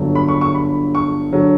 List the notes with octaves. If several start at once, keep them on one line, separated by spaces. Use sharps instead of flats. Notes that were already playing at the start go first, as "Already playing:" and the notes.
Already playing: G1 G2 D3 F#3
B5
C#6
C#6
B5
C#6
D3 F#3